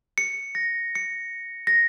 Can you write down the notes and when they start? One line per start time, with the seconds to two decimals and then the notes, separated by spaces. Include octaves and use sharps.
0.18 C#7
0.55 A#6
0.95 C#7
1.67 A#6